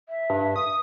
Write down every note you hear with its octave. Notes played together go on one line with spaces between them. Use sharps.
E5
G2
D#6